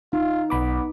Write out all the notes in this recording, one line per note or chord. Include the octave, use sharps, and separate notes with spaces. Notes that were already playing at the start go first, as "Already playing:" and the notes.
D#4 F4
B1 B3 B5 D6